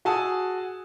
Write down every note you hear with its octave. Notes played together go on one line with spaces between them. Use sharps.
F#4 G#4 G#5 A5 D#6 E6